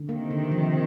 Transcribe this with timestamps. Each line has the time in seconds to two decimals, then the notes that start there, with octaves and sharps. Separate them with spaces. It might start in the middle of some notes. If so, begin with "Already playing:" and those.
Already playing: D3
0.08 C3 D#3 A#3
0.31 D3
0.51 F3